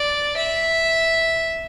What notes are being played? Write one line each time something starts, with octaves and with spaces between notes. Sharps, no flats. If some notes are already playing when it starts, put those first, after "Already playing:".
Already playing: D5
E5